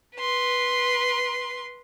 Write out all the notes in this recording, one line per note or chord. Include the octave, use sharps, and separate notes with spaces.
B4 C6